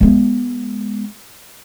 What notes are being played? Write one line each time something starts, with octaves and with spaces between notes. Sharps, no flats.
G#3 B3